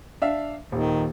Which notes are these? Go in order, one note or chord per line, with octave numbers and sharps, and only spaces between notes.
D4 E5 F5
D#1 D#3